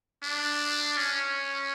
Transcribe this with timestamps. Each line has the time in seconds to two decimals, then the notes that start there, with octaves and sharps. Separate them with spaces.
0.23 D4
0.97 C#4